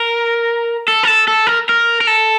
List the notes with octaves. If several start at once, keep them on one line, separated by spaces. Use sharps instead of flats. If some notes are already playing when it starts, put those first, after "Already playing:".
Already playing: A#4
A4
A#4
A4
A4
A#4
A#4
A#4
A4